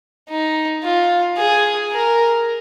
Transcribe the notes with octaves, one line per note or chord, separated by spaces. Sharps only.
D#4
F4
G#4
A#4